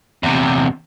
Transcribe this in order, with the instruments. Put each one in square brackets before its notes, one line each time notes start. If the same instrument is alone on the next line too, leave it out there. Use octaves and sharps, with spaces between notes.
[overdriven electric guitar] E2 C3